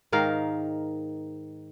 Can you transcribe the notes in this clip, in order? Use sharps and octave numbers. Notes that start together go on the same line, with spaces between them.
G#2 D#3 A#4 F5